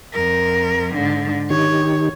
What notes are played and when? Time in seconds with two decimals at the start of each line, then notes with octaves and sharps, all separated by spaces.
0.13 F2 A#4
0.95 G#2 D3
1.50 D#3 D#4 G4 C#5